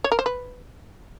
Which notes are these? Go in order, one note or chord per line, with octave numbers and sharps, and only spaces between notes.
C#5
A#4
C5
B4